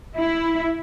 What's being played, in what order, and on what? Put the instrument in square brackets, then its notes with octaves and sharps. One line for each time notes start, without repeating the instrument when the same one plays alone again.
[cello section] E4